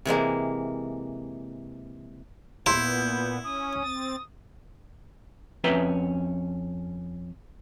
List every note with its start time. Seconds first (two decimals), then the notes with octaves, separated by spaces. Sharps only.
0.05 C3 E3 G#3 A#3
2.66 A#2 B3 E4 C6 G6
3.44 C#4 D#6
3.83 C4 A6
5.64 F2 C#4 B4 E5 G5 A#5